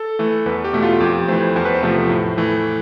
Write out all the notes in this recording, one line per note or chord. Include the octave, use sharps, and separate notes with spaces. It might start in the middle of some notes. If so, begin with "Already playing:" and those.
Already playing: A4
E3 A3
E2 B4
G4
B2 A3
F4
F2 G4
E3 A3 C5
E2 C5
B4
C5
C3 F3 A3
A2
E3 A3